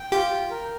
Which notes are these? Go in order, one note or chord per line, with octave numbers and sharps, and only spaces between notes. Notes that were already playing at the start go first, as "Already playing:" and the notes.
Already playing: G5
F4 G4
G5
A#4